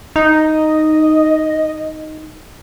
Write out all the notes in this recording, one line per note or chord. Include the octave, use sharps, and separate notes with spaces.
D#4 D#5